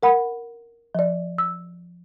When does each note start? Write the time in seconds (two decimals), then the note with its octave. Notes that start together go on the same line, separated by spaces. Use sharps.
0.03 A#4 F#5 B5
0.95 F3 D5
1.38 E6